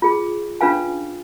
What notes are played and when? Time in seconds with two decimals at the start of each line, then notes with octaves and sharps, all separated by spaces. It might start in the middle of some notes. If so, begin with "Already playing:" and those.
0.02 F4 G#4
0.61 C#4 D4 F4 B4 F5 G#5